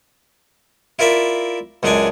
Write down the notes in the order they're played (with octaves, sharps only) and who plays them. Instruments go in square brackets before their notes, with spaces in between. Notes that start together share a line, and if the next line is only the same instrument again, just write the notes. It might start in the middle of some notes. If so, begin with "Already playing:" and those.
[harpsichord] E4 F4 A#4 D5 E5
C#2 F#2 G#3 D4 D5 G#5